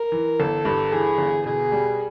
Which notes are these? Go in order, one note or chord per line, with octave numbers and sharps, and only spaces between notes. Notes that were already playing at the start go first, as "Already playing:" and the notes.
Already playing: A#4
E3
G1 A4
G2
E3 G#4
G1
B2 G#4
G3